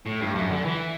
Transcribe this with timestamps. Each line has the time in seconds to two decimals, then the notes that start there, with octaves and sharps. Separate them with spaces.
0.06 A2
0.21 G2
0.35 F#2
0.50 D3
0.65 E3